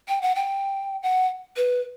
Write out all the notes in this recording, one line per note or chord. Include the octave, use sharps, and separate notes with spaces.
G5
F#5
G5
F#5
B4